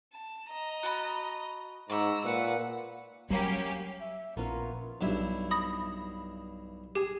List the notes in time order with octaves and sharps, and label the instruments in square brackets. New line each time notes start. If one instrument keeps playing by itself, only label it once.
[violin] A5
D#5 A#5
[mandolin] F#4 A5 B5
[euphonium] G#2 [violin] A#5 E6 [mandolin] B5 C#6 D6
[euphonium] A#2 [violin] B4 F#5
[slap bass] F#3 G3 [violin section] A#3 C#4 G4
[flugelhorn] E5
[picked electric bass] A#1 [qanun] B3 C#4 F4 [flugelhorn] A#4
[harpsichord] B1 G2 E4
[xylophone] B5 D#6 A#6
[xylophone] G4 [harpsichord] G#4